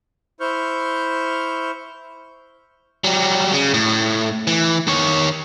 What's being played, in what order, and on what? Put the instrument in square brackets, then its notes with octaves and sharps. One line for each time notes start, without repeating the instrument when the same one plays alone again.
[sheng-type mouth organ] E4 C5 C#6 F6 G6
[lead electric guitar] F#3 G3
C#3
A2
E3
D#3 C#5